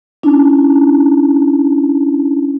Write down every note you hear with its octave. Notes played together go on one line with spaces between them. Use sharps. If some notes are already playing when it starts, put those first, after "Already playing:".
C#4 D4 E4